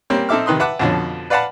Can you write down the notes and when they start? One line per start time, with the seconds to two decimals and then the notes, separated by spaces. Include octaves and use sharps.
0.10 G3 A#3 C4 C#4
0.29 C4 D#4 A4 E5 D6 F6
0.46 C3 D#3 B4 C6 D#6
0.60 B4 E5 F#5 A5 D6 F#6
0.79 F2 B2 D3 F3 C#4
1.30 B4 D5 F5 F#5 A5 B5